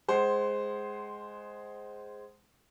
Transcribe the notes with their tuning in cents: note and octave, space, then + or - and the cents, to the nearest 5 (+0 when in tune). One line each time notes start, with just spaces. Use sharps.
G#3 +0 C5 +0 F#5 +35